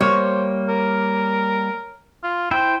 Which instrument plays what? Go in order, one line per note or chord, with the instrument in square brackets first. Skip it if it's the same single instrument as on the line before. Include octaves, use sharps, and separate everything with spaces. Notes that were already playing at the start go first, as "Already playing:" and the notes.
[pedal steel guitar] G3 A#3 [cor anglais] C5 [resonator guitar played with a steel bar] C#5
[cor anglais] A#4
F4
[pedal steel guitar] E4 C5 [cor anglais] G5